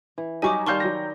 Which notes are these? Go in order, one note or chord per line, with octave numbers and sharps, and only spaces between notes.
E3
F#3 G3 D#4 D#5 G#5 C#6 D6
D#3 G3 F5 A5 C6 C#6 F6 G6
F#3 A#6